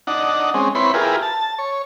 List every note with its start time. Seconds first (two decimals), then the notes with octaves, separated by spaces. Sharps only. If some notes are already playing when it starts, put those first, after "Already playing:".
0.07 D4 D#4 F#5
0.54 G#3 C4 C#4
0.75 C4 E4 B4 C#5 B5 C6
0.94 E4 F4 G4 G#4 A#4 B4
1.23 A5
1.58 C#5